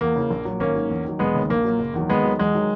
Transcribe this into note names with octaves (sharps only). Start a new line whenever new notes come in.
E2 A#3
C#3 E3
A#1
A#2 F#3
G#1 A#3 C#4
G#2 F#3
E2
D#3 F#3
E1 G#3 B3
D#2 C#3
A#1 A#3
A#2 F#3
F#1
E2 D#3 F#3
D#2 G#3 B3
D#3 F#3
E2 G#3
D#3 F#3